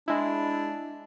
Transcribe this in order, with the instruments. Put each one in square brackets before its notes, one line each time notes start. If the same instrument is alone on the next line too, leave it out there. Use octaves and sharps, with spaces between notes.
[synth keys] G#3 E4 [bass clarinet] D4